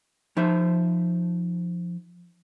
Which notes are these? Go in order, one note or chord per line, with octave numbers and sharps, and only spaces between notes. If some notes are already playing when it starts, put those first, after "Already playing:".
F3 D#4 C5 E5